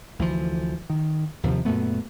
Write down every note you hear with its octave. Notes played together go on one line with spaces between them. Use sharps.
D2 E3 F3
D#3
D#2 C3 F3
F#2 A#2 A3 B3